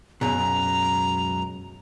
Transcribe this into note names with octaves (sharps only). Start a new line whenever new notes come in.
C#2 F#2 B2 A#5